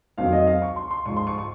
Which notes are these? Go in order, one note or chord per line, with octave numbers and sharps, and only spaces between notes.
F2 D#3 F#3 F5
D#5
F5
C#6
C6
C6
G#2 F3 C#6
C6
C#6
C#6